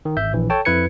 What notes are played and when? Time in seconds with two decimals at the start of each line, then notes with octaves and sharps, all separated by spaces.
0.05 D#3
0.17 G#1 E5 G6
0.33 A#1 E3
0.50 A4 C#5 G5 A5
0.65 F2 E4 B4 G#6 C#7